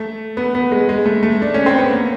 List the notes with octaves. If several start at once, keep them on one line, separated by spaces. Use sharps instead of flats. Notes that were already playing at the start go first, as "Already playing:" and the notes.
Already playing: A3
B3
B3
G#3
G#3
A3
A3
D4
C#4
C4
B3
A#3